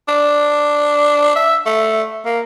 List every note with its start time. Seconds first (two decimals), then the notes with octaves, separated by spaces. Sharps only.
0.08 D4
1.36 E5
1.66 A3
2.25 A#3